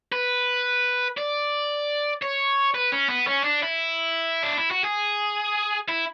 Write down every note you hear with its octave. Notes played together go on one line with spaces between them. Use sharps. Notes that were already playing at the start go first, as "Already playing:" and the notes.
B4
D5
C#5
B4
C#4
B3
C#4
D4
E4
D4
E4
F#4
G#4
E4